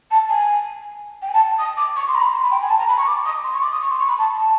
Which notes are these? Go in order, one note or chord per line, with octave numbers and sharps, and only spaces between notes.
A5
G#5
G5
G#5
A5
D#6
D6
C#6
C6
A#5
B5
C6
B5
G5
G#5
A5
A#5
B5
C#6
D6
D#6
C6
C#6
D6
D#6
C#6
C6
C#6
B5
A5
A5